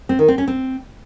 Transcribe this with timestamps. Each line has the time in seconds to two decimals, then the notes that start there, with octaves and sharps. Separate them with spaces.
0.09 C4
0.19 D#3
0.28 C4
0.38 C#4
0.48 C4